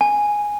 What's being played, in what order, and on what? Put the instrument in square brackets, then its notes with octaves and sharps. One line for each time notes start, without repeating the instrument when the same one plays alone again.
[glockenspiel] G#5